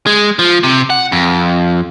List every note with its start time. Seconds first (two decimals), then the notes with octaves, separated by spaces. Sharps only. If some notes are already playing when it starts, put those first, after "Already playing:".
0.07 G#3
0.39 F3
0.63 C3
0.90 F#5
1.12 F2